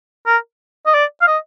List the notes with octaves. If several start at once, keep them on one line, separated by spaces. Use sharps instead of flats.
A#4
D#5
D5
F5
D#5